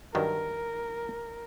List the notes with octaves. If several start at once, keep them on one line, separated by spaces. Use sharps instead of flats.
G2 D#3 F#3 A#4